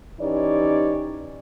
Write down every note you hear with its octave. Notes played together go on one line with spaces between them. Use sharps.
E3 C#4 D#4 G4 C#5 D5